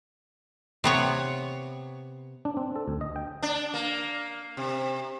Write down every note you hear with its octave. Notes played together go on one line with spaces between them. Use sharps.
C3 B3 C#5
D4
C4
A4
D2
D#5
G5
D4
A#3
C3